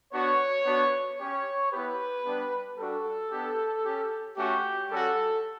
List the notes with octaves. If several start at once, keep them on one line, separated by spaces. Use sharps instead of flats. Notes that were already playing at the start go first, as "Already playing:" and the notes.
B3 D4 F#4 C#5
B3 D4 F#4
C#4 G4 C#5
B3 E4 G4 B4
G3 B3 D4 G4
G3 D4 F#4 A4
B3 D4 G4
C#4 G4
A3 C#4 F#4 G4
G3 C#4 F#4 A4